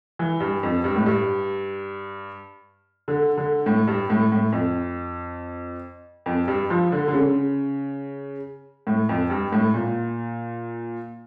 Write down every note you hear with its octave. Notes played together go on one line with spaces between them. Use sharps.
E3
G2
F2
G2
A2
G2
D3
D3
A2
G2
A2
A2
F2
F2
G2
F3
D3
D3
C#3
A2
F2
G2
A2
A#2